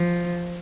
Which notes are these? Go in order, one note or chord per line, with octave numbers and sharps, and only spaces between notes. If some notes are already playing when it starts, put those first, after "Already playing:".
Already playing: F3